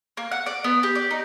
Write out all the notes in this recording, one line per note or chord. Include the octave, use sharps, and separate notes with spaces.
A#3
F#5
D5
B3
G4
D5
D#4